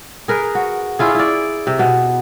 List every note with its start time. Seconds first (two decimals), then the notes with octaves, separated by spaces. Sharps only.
0.28 G#4 A#4 B4
0.55 F#4
0.99 C#4 E4 F4 G#4
1.15 E4 D5
1.67 C3
1.79 B2